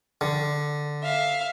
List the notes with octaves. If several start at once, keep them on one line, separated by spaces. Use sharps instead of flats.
D3
E5 F5